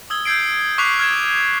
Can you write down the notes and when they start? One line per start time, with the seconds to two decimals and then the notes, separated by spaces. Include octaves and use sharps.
0.10 D#6 E6 G#6 G7
0.25 E6 G6 G#6 C7 D7
0.78 C#6 D6 F#6 B6 C7 F7
1.00 F6 G#6 E7